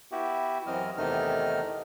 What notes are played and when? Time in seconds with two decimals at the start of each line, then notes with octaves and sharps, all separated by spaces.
0.12 B3 E4 F#4 G4
0.67 F#2 E3 F#3 C4 D#5 F6
0.97 E2 C3 D#3 A3 D#4 F6